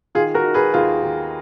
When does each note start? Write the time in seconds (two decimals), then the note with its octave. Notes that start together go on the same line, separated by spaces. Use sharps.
0.15 D#3 F4 G#4
0.34 F#4 A#4
0.45 D#3
0.54 G#4 B4
0.74 D#2 F4 G#4
1.03 D#2